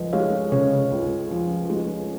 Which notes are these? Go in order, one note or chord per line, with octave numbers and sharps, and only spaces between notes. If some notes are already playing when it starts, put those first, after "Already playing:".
Already playing: C#2 F3 B4 D#5
G#3 C#5 F5
C#3 C#5
C#2
F3
G#3